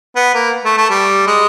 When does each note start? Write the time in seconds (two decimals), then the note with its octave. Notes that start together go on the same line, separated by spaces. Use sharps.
0.16 B3
0.34 A#3
0.65 A3
0.77 A3
0.90 G3
1.27 G#3